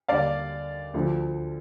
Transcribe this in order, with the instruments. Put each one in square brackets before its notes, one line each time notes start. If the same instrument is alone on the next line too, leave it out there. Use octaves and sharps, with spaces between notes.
[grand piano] D#2 D3 G3 D5 F5
D2 D3 F3